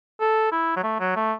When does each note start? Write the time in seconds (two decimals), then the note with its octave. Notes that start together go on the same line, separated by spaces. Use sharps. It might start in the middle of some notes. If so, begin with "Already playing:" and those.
0.21 A4
0.52 E4
0.76 F#3
0.83 A3
1.00 F#3
1.16 A3